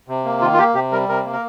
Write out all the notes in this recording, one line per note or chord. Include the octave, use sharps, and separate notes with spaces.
C3
A#3
D#3 F4
F4
A#3 G4
C3 G4
G3 A#4
C3 A#4
A#3
A#4